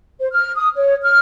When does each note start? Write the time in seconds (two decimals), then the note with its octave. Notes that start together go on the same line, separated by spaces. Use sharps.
0.19 C5
0.32 F6
0.56 D#6
0.76 C#5
1.02 F6